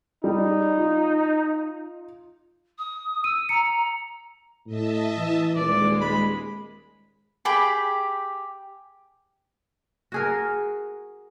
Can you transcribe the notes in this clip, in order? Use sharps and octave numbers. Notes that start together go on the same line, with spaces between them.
G3 D#4
F4
D#6
E6 D#7
A#5 C#7
A2 D#5 E5 A5
E3
D#1 G#3 D5
B5
G4 G#4 G5 B5
F#4 G#4 A#4